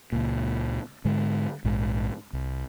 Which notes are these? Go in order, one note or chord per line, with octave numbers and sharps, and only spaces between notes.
C#2 A#2
G#2 D3 G#3
A#1 G#2
C2